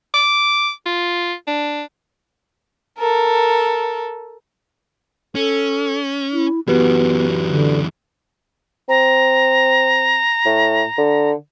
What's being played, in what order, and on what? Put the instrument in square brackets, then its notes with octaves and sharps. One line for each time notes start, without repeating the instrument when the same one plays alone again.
[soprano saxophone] D6
F4
D4
[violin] A4 A#4
[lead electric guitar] C#4 [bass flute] A4
[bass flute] E4
[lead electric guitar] F#2 E3 [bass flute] B3 [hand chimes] F#4 G4 B4
[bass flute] D3
[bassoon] C4 [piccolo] A#5
[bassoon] A2
D3